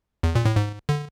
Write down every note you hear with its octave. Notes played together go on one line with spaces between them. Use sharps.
E2
A#2
A2
G#2
D3